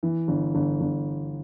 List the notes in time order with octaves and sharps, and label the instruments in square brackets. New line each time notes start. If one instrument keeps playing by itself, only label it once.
[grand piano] E3
G1
G1
G1